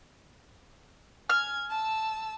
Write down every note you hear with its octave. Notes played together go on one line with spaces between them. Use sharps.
G#5 F6 G#6
A5 E6